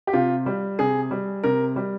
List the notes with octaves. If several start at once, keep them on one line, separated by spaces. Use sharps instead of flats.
G4
C3 F4
G3
C3 G#4
G3
C3 A#4
G3